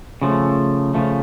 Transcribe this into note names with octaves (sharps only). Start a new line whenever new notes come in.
C#3 F3 A3
C#3 F3 A3